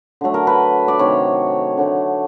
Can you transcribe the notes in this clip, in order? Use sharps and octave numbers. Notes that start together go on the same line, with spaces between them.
D3 F#3 A3
A#4
B4
D5
C3 D#3 F#3 A3 C#5
D3 F#3 A3